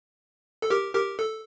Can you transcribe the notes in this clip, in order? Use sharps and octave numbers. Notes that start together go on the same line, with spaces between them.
A4
G4 A#4
G4 A#4
A4